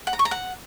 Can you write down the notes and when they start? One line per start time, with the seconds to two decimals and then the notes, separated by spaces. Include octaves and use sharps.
0.07 F#5
0.13 A#5
0.19 C#6
0.25 A#5
0.31 F#5